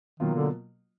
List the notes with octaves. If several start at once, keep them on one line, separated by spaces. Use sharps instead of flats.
B2 D#3 F#3 A#3 F4
D3